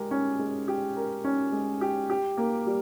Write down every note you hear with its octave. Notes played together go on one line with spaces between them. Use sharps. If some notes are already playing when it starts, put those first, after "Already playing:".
Already playing: G#3 G4 A#4
C#4
G#3
G4
A#4
C#4
G#3
G4
G4
A#3
G3